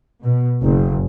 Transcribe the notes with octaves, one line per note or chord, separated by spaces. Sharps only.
B2
F#1